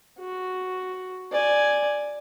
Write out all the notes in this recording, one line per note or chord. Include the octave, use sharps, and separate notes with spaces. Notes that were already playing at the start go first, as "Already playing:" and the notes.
F#4
D5 G#5